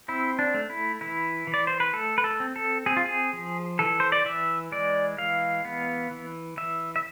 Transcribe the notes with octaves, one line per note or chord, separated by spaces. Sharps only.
C4 E4
D4
A3
E4
E3 E4
E3
D5
C5
B4
A3 A4
B4
A4
C4
A4
C4 G#4
F4
G#4
F3
E3 A4
C5
D5
E3 E5
G#3 D5
E3 F5
B3
E3
E3 E5
E5